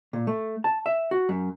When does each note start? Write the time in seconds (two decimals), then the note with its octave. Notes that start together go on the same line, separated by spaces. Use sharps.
0.13 A#2
0.27 A3
0.64 A5
0.86 E5
1.11 F#4
1.29 F#2